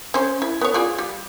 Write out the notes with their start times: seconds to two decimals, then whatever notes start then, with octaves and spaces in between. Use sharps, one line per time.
0.14 C#4 C5
0.42 E4
0.61 B3 C#5
0.74 F4 G#4 D5
0.98 G3